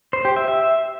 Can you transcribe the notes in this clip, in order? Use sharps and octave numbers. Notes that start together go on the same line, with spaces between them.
C5
G4
E5
E5